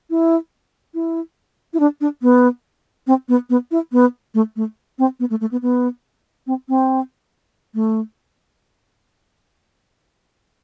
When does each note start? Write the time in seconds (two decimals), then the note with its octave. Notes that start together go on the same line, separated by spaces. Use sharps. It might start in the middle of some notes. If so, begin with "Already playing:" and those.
0.10 E4
0.94 E4
1.74 E4
1.80 D4
2.01 D4
2.22 B3
3.07 C4
3.29 B3
3.50 B3
3.71 E4
3.92 B3
4.34 A3
4.56 A3
4.99 C4
5.20 B3
5.30 A3
5.41 A3
5.52 B3
5.62 B3
6.47 C4
6.69 C4
7.75 A3